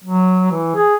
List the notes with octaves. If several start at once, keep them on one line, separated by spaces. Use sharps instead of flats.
F#3
E3
G#4